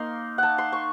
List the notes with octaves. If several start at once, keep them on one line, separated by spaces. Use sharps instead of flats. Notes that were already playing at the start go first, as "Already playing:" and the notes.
Already playing: A#3 D#4 C6
F#5 A5
C6
C#6